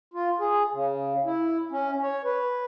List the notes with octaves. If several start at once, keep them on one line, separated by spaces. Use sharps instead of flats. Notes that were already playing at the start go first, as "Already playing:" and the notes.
F4
G#4
C#3
E4
C#4
C#5
B4